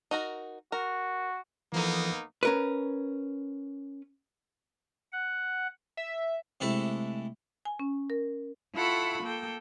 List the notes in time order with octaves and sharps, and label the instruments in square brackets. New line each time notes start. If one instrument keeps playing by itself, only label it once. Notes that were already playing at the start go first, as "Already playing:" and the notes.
[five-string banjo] D#4 F#4 A#4
[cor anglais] F#4 [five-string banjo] A#4
[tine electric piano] E3 F3 A4 [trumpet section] A#3 B3 D#4
[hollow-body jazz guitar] C#4 A#4 B4
[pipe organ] F#5
[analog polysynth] E5
[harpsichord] C3 G#3 A3 E4 A5
[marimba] G#5
C#4
A#4
[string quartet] E4 F4 A4 F#5 B5 C#6
A#3 A4 G5